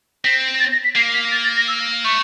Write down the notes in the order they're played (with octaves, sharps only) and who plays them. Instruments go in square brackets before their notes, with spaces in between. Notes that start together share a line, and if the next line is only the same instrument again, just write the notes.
[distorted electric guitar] C4 [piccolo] B6
[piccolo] A6
A#6
B6
[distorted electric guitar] A#3 [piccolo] C7
[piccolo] B6
A6
A6
A#6
E6
[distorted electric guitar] A3 [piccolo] C#6